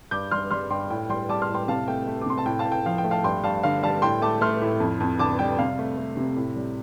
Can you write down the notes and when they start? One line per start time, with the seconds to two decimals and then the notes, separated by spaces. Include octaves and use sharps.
0.11 G2 D6 G6
0.31 G3 C6 F6
0.51 G3 C6 F6
0.70 G2 G5 C6
0.90 A2 G5
1.09 G3 G5 C6
1.29 G3 A5 D6
1.42 C6 F6
1.49 A2
1.55 G5 C6
1.68 C3 F5 A5
1.88 A3 G5
2.07 A3
2.22 D6
2.26 C3 C6
2.38 A5
2.46 A2 G5
2.59 F5 A5
2.65 A2
2.72 G5
2.86 F3 F5
2.98 G5
3.04 A3
3.11 F5 A5
3.24 G2 G5 C6
3.43 G2 F5 A5
3.63 D3 F5
3.83 G3 F5 A5
4.02 A2 G5 C6
4.22 A3 A5 D6
4.41 A3 C6 F6
4.62 A2
4.80 F2
5.00 F2
5.19 D3 A5 D6
5.39 G3 G5
5.59 C3 F5
5.79 A3
5.98 A3
6.17 C3
6.36 A2
6.56 G3